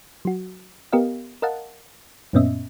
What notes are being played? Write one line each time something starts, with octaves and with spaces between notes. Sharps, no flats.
F#3 F#4
B3 G4 A#4 D#5 F5
A#4 D#5 F5 F#5 A5
F#2 A#2 B3 C#4 D#5 E5